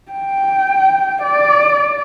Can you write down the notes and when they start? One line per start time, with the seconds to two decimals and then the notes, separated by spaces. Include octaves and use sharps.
0.11 G5
1.23 D5